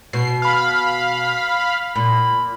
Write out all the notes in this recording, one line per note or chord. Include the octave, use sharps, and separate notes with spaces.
B2 C7
F5 B5
A#2 B5